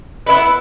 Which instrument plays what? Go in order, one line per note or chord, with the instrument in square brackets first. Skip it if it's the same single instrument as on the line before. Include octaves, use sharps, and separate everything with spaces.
[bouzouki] B3 E4 B4